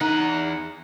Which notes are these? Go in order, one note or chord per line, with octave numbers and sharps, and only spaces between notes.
E2 D#4 F#5